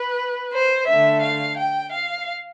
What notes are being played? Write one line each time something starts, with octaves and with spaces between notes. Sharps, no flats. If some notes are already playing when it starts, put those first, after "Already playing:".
Already playing: B4
C5
D3 A3 E5
F5
G5
F5